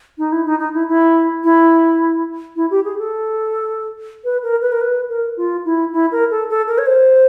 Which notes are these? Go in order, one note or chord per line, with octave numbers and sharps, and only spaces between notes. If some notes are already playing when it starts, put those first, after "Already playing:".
D#4
E4
D#4
D#4
E4
E4
E4
E4
G4
G#4
A4
B4
A#4
B4
A#4
B4
A#4
F4
E4
E4
A#4
A4
A4
A#4
C#5
C5